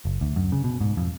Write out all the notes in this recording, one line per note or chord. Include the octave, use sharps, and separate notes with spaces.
F#1
D2
F#2
C#3
B2
G#2
F2